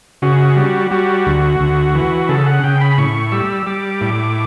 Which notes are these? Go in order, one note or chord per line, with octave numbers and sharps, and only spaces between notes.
C#3 F#4
G3
G3 F#4
D2
D2
E3
C#3 A4
F#5
C#3 G5
B5
A2 C#6
G3 E6
G3 D6
A2